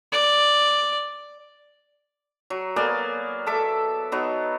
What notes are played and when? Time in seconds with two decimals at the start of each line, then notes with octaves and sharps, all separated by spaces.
0.12 D5
2.50 F#3
2.76 A#3 B3 D5 G#5
3.46 A4 E5 D6
4.12 F#3 B3 D#4